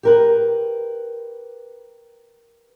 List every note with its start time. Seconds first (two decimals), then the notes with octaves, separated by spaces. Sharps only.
0.03 G4 A#4 B4